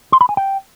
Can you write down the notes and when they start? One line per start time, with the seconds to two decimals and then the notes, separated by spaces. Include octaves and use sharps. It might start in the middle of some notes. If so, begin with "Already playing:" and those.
0.12 C6
0.21 B5
0.29 G#5
0.37 G5